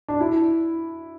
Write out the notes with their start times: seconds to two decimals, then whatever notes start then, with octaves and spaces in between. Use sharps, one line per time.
0.08 D4
0.20 E4